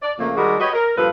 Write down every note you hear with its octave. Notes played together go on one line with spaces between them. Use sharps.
D5
F2 C#3 A3 A#3
D#3 G3 G#3 F#4 G#4 A#4
F#4 G4 B4 C#5 D#5
A#4
G2 A#2 F3 A4 B4 F5